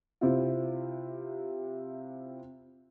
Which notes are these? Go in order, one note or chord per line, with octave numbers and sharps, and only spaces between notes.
C3 C4 E4 F4